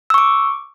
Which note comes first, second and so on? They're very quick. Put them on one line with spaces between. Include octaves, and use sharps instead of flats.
E6 C#6 D6